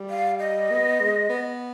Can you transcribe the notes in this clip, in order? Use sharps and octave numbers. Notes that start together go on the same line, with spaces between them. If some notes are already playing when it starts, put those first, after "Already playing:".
Already playing: G3
F5
D#5
B3
G#3
B3